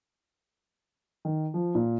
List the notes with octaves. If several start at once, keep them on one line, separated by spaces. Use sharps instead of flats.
D#3
F3
A#2